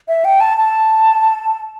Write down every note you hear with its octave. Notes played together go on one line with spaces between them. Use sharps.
E5
G5
A5
A5